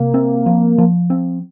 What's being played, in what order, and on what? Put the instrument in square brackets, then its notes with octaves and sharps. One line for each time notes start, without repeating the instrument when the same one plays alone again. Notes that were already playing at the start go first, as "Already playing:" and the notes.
Already playing: [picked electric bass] C3 [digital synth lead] A#3
[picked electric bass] C4
F3
F3
C4